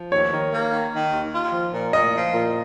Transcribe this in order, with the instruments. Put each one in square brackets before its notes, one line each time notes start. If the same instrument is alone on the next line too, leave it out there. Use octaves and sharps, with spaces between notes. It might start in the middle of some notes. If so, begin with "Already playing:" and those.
Already playing: [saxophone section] F3
[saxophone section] D#2 [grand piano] C#5
[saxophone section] D#3
A#3
D#3
D#3
D#2
F4
F3
A#2
[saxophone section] A#2 [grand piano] D#5
[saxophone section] F3
A#2